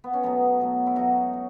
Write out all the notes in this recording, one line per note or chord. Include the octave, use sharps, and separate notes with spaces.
B3
C#4
B2 F#3 A3 B3 D#4
B2 F#3 A3
E4
G#2 F#3 A3 D#4 F#4
F#3